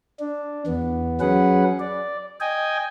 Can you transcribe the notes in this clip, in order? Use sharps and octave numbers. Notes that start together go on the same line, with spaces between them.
D4
E2 B3
F#3 C#4 G#4 B4 F#5
D5
D#5 G5 G#5